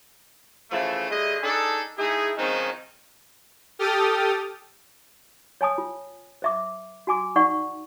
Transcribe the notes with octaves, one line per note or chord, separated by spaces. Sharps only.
C#3 E3 F3 A3
D3 G3 A3 G#4 D#5
D4 D#4 G#4 A4
A3 D#4 E4 G#4
D#3 F3 G#3 C4 C#4 D#4
G4 A4 G5 D#6 F6 A6
C#5 G#5 A5 D#6
F4
C5 E5 D6
F#4 G#5 D6
D#4 D5 F#5 C#6